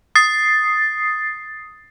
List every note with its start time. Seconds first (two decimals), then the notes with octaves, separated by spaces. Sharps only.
0.15 D#6 A6 C7